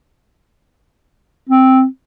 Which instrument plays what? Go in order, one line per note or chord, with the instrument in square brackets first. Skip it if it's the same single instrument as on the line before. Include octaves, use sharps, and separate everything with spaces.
[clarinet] C4